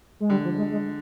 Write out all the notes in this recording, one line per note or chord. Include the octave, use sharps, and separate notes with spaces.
G#3
D3 G3
F3
G#3
G#3